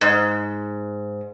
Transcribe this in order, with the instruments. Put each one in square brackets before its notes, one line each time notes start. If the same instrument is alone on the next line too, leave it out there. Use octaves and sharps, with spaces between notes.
[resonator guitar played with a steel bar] G#2